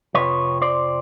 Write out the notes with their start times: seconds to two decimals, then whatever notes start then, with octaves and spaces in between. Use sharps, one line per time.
0.14 F2 C3 F3 B4 C#5
0.62 C5 D5